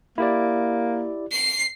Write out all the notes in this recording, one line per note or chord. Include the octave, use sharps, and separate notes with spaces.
A#3 E4 G4 D5
C7